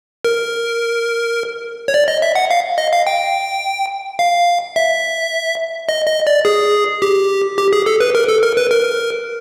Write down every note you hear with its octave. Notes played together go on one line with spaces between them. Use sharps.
A#4
C#5
D5
D#5
E5
F#5
F5
D#5
F5
G5
F5
E5
D#5
D#5
D5
G#4
G4
G4
G#4
A4
B4
A#4
A4
A#4
B4
A#4